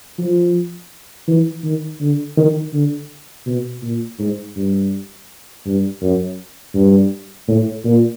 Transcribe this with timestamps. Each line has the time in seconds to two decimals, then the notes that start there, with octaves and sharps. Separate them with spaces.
0.18 F3
1.28 E3
1.64 D#3
2.01 D3
2.37 D#3
2.73 D3
3.46 B2
3.82 A#2
4.19 G#2
4.56 G2
5.66 G2
6.02 F#2
6.74 G2
7.48 A2
7.84 A#2